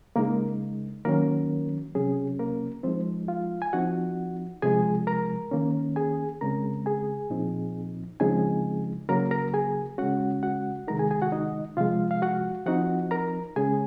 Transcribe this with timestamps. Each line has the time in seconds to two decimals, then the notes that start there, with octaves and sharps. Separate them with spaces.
0.16 C#3 G#3 A#3 D#4 A#4
1.05 D#3 F#3 A#3 C#4 A#4
1.95 C3 F#3 C#4 G#4
2.39 A#3 A#4
2.83 F3 G#3 C4 D#4 C5
3.28 F4 F5
3.62 G#5
3.73 F3 C4 D#4 F#4 F#5
4.62 C3 F3 G#3 G#4 G#5
5.07 A#4 A#5
5.51 D#3 A#3 C#4
5.96 G#4 G#5
6.41 C#3 G#3 C4 A#4 A#5
6.86 G#4 G#5
7.30 A#2 F3 C4 D#4
8.20 C#3 F3 G#3 C4 D#4 G#4 G#5
9.09 C#3 F#3 A#3 A#4 A#5
9.31 A#4 A#5
9.54 G#4 G#5
9.98 C#3 G#3 C#4 F#4 F#5
10.43 F#4 F#5
10.87 C3 D#3 G#3 D#4 A#4 A#5
10.99 G#4 G#5
11.11 G#4 G#5
11.22 F#4 F#5
11.32 D#4 D#5
11.77 C3 F3 G#3 F4 F5
12.11 F5
12.22 F#4 F#5
12.66 F3 C4 D#4 F#4 F#5
13.11 A#4 A#5
13.56 C#3 G#3 C#4 G#4 G#5